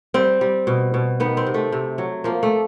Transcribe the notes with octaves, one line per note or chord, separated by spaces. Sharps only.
G3 C4
G3
B2
B2
D#3 B3
C4
C3
A3
C3
F#3
F3 A#3
A3